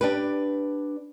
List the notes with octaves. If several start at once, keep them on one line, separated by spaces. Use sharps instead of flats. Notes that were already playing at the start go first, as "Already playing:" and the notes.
D4 G4 B4